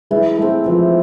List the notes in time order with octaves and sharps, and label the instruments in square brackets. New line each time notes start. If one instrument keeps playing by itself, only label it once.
[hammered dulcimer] E3 [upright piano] G#3
[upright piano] G#3 [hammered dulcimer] A3 C4
[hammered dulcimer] E3 [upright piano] F3